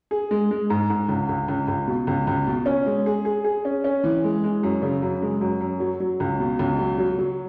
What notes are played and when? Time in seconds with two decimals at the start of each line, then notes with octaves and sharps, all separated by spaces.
0.11 G#4
0.31 G#3
0.51 G#3
0.70 G#2
0.90 G#2
1.09 C#2
1.29 C#2
1.48 C#2
1.68 C#2
1.87 B2
2.07 C#2
2.27 C#2
2.47 B2
2.66 C#4
2.86 G#3
3.06 G#4
3.25 G#4
3.44 G#4
3.65 C#4
3.84 C#4
4.04 E3
4.24 G#3
4.44 G#3
4.63 F#2
4.82 C#3
5.02 F#2
5.22 G#3
5.41 F#2
5.61 F#2
5.80 F#3
6.00 F#3
6.20 C#2
6.40 B2
6.59 C#2
6.79 F#3
6.98 F#3
7.18 F#3